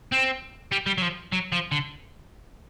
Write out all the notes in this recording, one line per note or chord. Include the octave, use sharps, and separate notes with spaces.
C4
G3
G3
F#3
F3
F#3
F3
D3